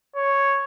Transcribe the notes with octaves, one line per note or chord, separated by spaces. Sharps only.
C#5